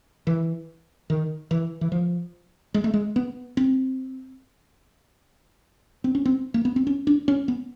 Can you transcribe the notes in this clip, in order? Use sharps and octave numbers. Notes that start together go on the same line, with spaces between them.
E3
D#3
E3
E3
F3
G#3
A3
G#3
B3
C4
C4
C#4
C4
A#3
B3
C4
C#4
D4
C#4
B3